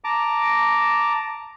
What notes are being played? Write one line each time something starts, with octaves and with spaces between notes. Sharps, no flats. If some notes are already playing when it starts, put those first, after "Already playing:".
A5 A#5 D6